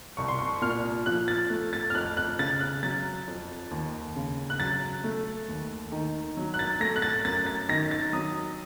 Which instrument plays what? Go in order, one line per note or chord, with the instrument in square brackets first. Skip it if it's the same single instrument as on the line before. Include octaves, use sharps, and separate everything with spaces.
[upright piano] C2 C#6
C6
C#6
A#2 F6
F3 F#6
A6
A3
A6
F6
F2 F#6
F#6
C#3 A6
F#6
F#3 A6
F2
D#2
C#3
F#6
F#3 A6
A3
D#2
D#3
F#3
F#6
A6
A3 A#6
F#6
A6
F#2 A6
A6
D#3 A#6
A6
F#3 D#6